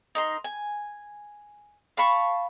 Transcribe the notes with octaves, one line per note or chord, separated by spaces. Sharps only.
D#4 A#4 C6
G#5
F5 A5 B5 C#6